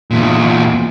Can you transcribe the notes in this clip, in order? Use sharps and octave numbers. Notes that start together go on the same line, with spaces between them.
E2 A#2